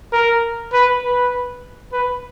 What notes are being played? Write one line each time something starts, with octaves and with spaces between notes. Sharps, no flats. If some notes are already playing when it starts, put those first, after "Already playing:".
A#4
B4
B4
B4